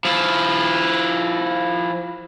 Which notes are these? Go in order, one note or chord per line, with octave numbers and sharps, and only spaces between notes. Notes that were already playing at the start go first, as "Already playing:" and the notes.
F3 E4